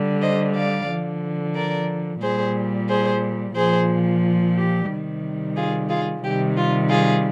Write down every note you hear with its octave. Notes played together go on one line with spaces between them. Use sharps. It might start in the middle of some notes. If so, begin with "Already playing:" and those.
Already playing: D3 G3
C5 D#5
D5 F5
D3 F3
A#4 D5
A#2 G3 G#4 C5
G#4 C5
A#2 F3 G#4 C5
G4
C3 D#3 G3
F4 G#4
F4 G#4
C3 D#3 G3 G4
F4
F4 G#4